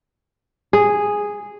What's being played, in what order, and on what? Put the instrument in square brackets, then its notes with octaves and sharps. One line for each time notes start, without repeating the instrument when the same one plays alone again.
[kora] G#4